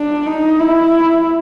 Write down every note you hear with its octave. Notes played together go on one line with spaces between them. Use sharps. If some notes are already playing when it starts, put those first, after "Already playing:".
Already playing: D4
D#4
E4